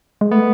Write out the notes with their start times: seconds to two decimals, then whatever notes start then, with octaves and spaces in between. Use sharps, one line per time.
0.21 G#3
0.31 A3 B3